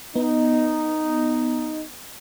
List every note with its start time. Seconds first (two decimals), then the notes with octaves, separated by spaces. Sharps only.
0.16 B3 D#4